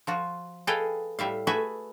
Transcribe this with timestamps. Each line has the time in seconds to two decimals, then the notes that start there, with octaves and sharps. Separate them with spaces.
0.07 F3 F4 F#4
0.67 G#4 A4 B4 D#5 F5 G5
1.19 A2 G3 E5 F5
1.47 A3 F#4 G#4 B4 E5 G#5